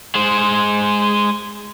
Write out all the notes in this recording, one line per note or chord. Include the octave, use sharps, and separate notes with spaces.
G#3 C5